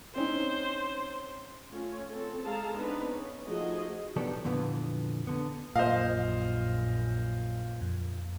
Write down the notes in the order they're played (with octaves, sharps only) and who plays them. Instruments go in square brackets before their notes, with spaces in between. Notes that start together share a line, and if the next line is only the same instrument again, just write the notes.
[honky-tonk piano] C4 C#4 D#4 [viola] C5
[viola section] A3 C#4 F4 C#5
C4 A4
G#3 G#4 A4 F5 A5 A#5
B3 C4 D4 D#4 B4
C#4
F3 A3 D#4 F#4 G#4 D#5
[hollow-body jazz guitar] D#3 F#3 G3 B3 D4 A4
F2 A#2 D3 E3 B3
D3 B3
[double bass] A#1 F#2 [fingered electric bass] A#2 [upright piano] C5 D#5 F5
[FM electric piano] F2